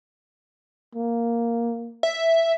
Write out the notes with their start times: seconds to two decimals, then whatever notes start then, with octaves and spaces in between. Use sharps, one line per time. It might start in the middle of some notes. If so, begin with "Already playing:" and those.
0.95 A#3
2.03 E5